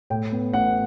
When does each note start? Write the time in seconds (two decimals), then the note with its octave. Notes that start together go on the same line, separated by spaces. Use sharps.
0.10 A2 G5
0.32 B3
0.53 A1 F#5